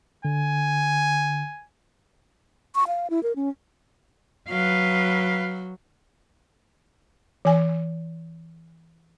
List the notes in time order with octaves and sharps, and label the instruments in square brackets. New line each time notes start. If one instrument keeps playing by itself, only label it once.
[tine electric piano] D3 [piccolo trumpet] G#5
[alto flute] C#6
F5
E4
A#4
C#4
[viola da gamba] F#3 [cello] B4 F5
[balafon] E3 G#5